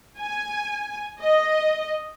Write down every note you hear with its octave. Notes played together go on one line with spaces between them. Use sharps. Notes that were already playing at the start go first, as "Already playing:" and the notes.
G#5
D#5